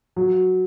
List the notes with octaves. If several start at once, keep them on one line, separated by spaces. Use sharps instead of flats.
F#3